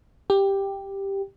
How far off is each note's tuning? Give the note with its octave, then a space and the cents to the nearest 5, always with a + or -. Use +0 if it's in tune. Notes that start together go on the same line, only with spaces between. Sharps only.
G4 +5